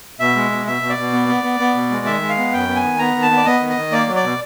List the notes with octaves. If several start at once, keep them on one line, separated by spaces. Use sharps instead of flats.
B2 E5
G#3
B2
B2 E5
B2
D5
B2
B3
B3
B3
B3
B2
G#3
D#3 E5
G#3
F5
B3
F#2 G5
B3
G#5
D#3
B3 A#5
D#3
A5
B3
D5
B3 D#5
D#3
D#5
D#3
A#3 D5
F#3
D5
B2